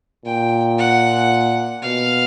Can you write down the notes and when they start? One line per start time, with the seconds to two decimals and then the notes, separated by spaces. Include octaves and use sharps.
0.25 A#2 G5
0.78 F#5
1.82 B2 F5